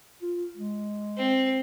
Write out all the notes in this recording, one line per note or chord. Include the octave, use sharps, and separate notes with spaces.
F4
G#3
C4